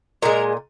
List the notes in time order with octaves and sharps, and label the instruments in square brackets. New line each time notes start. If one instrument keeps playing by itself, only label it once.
[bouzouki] A#2 G#3 A#4